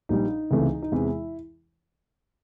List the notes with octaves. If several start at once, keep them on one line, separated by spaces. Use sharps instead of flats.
A#1 A#2 G3 D#4
C#2 C3 E3 A3
D#4
E2 C3 E3 G#3 E4